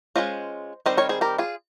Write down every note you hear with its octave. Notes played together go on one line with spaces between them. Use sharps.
G#3 C#4 F4 C5 D#5
D#3 G3 C4 C5 D#5
A#4 C#5
G#4 C5
G4 A#4
F4 G#4